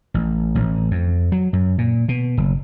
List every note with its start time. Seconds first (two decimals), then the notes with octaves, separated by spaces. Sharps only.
0.14 A1
0.55 A1
0.91 F2
1.32 F#3
1.53 F#2
1.78 A#2
2.08 B2
2.37 F#1